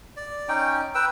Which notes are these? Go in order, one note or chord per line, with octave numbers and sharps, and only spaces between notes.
D5
C#4 D#4 G5
B4 G5 E6